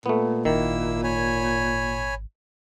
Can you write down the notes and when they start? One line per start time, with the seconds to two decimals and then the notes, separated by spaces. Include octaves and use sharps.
0.06 A#2 A3 B3
0.45 G#1 D#3 A#3 E4 E6
1.04 C#5 G#5 B5